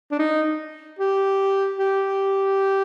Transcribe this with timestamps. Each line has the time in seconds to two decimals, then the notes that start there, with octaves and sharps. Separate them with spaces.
0.11 D4
0.19 D#4
0.99 G4
1.78 G4